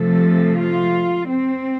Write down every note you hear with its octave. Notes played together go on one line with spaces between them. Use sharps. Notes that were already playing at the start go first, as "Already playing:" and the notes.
Already playing: C3 F3 A3 A4
F4
C4